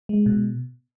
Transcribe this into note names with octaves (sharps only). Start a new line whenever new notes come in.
G#3
B2